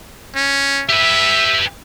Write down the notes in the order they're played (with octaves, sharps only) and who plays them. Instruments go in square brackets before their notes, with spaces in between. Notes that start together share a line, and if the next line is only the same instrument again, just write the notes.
[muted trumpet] C#4
[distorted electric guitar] G4 B4 [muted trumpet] E5